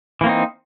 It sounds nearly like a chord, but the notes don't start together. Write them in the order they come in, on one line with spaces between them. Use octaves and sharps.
E3 A#3 C4 D#4